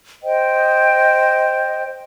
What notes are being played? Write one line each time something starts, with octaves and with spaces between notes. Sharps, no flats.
C5 D#5 G5